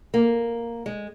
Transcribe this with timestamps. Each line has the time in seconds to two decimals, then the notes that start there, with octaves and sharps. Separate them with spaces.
0.14 A#3
0.86 G#3